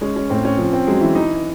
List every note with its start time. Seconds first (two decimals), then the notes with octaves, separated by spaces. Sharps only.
0.01 G#3 C#4
0.16 C#4
0.30 A2 C4
0.45 C#4
0.58 F3 C#4
0.73 C4
0.87 F#3 G#3
1.01 E3
1.15 E3 D#4